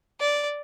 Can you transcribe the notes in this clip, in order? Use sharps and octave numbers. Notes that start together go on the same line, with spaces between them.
D5